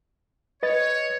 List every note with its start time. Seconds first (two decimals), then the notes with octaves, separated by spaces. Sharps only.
0.63 B4 C#5 D#5 A6